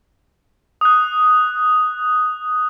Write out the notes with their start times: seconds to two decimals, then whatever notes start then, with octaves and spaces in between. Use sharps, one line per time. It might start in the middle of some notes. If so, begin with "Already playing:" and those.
0.81 D#6 F#6